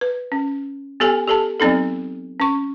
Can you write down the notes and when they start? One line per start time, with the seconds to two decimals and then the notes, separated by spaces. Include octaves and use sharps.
0.01 B4
0.32 C#4
1.00 B3 G4 A4 G#5
1.27 G4 A4 A5
1.60 F#3 B3 C4 D#4 A4
2.40 C#4 C#6